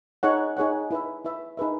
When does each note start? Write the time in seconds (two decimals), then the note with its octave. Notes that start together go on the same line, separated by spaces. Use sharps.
0.23 D#4 G#4 C#5 F#5
0.57 D#4 G#4 C#5 F#5
0.91 E4 B4 E5
1.24 E4 B4 E5
1.57 D#4 G#4 B4 E5